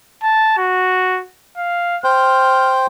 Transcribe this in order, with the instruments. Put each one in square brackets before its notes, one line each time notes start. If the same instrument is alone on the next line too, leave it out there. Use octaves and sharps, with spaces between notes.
[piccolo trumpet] A5
F#4
F5
[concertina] C5 G5 [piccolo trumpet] F6